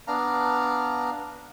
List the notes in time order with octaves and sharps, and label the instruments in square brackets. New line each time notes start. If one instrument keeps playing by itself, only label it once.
[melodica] B3 D4 F5 A#5